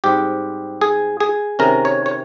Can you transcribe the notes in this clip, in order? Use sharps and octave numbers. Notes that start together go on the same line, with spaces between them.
G#2 G3 C4 G4
G#4
G#4
C3 D#3 G#3 C#4 A#4
C#5
C#5